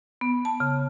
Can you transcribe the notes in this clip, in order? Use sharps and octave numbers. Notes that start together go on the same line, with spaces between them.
B3
A5
C#3